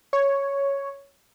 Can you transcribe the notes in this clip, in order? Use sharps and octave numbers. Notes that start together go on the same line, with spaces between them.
C#5